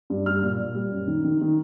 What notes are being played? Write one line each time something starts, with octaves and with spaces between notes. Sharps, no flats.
G2
G3 F6
A#2
A#2
G3
F#2
D#3
D#3
D#3